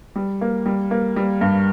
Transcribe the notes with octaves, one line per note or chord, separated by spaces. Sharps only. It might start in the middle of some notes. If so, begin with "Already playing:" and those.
G3
A#3
G3
A#3
G3
G2